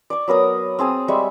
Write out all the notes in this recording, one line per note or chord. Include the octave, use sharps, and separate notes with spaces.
D5 C#6
F#3 B3 A#4 D#6
C4 G#4 A5 D#6
G3 G#3 E5 C#6